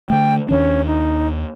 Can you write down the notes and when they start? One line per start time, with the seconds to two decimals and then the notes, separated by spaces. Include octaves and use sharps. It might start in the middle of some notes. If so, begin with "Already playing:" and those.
0.10 D3 A3 G5
0.49 D#2 D#3 C#4 D4
0.87 D#4